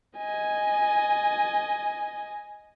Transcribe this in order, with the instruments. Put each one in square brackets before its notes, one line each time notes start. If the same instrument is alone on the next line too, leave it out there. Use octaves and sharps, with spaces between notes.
[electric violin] D#5 G#5